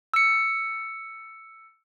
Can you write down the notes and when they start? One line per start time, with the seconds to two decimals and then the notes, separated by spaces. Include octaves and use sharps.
0.14 E6 C#7